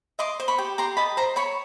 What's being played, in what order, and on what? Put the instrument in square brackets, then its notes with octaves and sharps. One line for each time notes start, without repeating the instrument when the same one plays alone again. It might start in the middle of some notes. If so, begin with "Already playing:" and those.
[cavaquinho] D#5 C6 D6
C5
B5 C#6
G4
G4 A#5 C6
D#5 A5 B5
C5 A#5 C6
C#5 B5 C#6